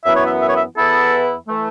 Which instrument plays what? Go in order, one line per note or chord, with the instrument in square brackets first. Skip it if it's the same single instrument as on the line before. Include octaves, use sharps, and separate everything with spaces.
[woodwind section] F#2 E3 B3 E4 [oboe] E5
[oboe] C#5
E5
E5
C#5
E5
[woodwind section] E2 E3 B3 E4 [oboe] A4
[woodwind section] E3 A3